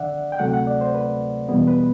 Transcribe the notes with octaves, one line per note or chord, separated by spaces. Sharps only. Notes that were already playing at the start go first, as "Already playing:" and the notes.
Already playing: D3 D5 E5 F#5
G5
D2 C3 F#3 A3 F#5
F#5
D5
C5
B4
E2 B2 G3 B3
B4